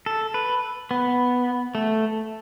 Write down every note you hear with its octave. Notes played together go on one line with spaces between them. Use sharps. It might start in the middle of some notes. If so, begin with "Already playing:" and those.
A4
B4
B3
A3